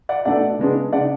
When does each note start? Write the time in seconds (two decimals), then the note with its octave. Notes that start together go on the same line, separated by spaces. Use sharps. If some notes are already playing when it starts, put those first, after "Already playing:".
0.09 D5 F#5
0.25 B2 A3 D4 D5 F#5
0.59 C#3 G#3 B3 D4
0.92 C#3 G#3 D4 D5 F#5